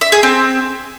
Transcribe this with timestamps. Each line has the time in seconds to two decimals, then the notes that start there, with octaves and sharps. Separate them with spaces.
0.01 E5
0.12 G#4
0.23 C4